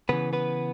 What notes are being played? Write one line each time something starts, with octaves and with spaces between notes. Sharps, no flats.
C#3 E3 B3 B4
B3 B4